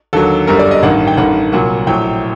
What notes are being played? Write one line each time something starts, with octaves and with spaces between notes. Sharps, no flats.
D#2 D3 F#3 A4
G1 F#2 D3 G3 A#4
D5
D#5
A1 G2 D#3 F#5
G5
A1 G2 D#3 F#5
C2 A#2 F#3 F#5
A#1 A2 F#3 G5